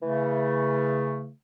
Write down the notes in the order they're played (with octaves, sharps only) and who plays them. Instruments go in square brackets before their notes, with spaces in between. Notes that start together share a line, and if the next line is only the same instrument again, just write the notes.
[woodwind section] C#3 A3 [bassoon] E3